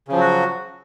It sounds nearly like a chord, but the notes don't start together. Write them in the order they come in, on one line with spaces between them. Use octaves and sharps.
C#3 F3 F#3 F#4